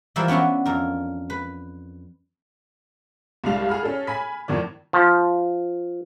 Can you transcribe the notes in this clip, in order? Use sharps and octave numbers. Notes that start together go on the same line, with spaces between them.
E3 F3 G3 E4 A#4
B3 C#4 D4 E4 F#4
F2 A#4
B4
C2 G2 G3 G#3 F5 F7
G#4 F#5 B5 F6
C#4 G#4 A4
G#5 B5 B6
F2 A2 D#3 D5
F3